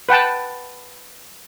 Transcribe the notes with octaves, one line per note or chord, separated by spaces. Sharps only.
B4 F#5 G5 A5